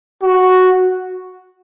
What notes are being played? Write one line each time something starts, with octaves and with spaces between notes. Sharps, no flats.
F#4